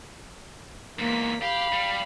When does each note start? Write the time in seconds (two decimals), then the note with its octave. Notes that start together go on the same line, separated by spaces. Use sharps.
0.99 E2 G#2 A#3 B6
1.42 G4 F5 B5
1.72 G3